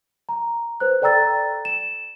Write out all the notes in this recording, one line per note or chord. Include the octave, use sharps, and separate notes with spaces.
A#5
B4 C5 F#6
A4 D5 G5 A#5 E6 A6
E7